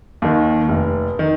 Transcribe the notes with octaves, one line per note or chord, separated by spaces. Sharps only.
D#2 D#3
F1
D#3